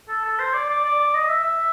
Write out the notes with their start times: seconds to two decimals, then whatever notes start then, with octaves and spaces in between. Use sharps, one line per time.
0.09 A4
0.24 A4
0.39 C5
0.54 D5
0.69 D5
0.84 D5
0.99 D5
1.14 D#5
1.29 E5
1.44 E5